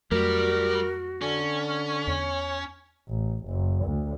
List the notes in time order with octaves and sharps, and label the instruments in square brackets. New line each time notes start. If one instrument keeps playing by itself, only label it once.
[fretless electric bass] F2 F#3 A3 [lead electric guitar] G3 [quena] F#4 [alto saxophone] A#4
[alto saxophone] D3 [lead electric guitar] C#4
[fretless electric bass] E2 [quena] C#5
[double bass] A1
F#1
D2